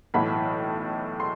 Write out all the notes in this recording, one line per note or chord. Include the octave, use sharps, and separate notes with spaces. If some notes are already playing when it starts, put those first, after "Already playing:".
B1 A2 E3 B5
C6